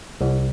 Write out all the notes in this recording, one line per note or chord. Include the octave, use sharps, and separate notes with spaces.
C2